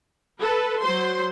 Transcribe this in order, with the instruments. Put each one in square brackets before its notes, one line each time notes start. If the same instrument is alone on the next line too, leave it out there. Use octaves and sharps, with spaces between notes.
[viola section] A4 B4
F#3 C5 C6